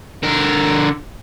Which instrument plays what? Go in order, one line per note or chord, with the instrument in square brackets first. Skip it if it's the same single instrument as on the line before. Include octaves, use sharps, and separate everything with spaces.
[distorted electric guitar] D3 A#4